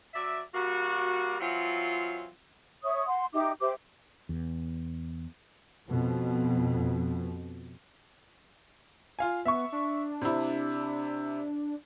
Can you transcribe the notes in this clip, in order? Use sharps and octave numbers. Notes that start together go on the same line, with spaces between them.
F#3 D5 E5
G3 A#3 F#4
E3 F#3 C4 F4
C#5 E5 C#6 D#6
F#5 C6
D#4 G4 E5 D6
G4 C5 E5 D6
E2
F2 B2
F4 F5 G#5
B3 E5 C#6
D4
C3 E4